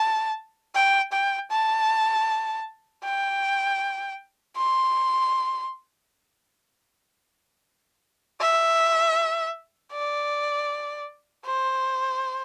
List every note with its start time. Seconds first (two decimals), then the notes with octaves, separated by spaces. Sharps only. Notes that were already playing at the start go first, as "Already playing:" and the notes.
Already playing: A5
0.75 G5
1.13 G5
1.51 A5
3.04 G5
4.57 C6
8.40 E5
9.93 D5
11.46 C5